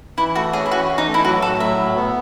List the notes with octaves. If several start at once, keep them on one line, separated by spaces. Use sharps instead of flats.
E3 E4
A3 F#4
C#4 G#4
E4
E3 F#4
E3
D#4
A3
E4
F#3 F#4
A2 A4
F#3 E5
A2
B3